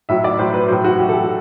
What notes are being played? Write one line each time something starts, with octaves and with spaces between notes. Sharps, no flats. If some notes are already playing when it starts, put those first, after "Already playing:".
A2 F#3 E5
D5
A2 F#3 C5
B4
A2 F#3 C5
F#4
A2 F#3 G4
A4
G4